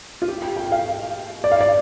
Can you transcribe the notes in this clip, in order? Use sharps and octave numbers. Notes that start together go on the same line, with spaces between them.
F4
G4
G5
G5
F5
D5
F5
D5